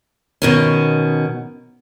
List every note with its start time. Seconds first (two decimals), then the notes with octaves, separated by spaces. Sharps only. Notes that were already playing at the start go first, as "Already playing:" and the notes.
0.42 B2 D#3 C#4